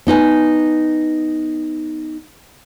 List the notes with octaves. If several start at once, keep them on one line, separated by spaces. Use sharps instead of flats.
B3 D#4 B4 G#5